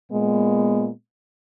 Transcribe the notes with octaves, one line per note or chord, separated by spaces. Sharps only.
A#2 G#3 B3